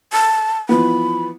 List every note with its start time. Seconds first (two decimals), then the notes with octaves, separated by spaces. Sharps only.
0.13 A5
0.69 E3 F3 B3 B5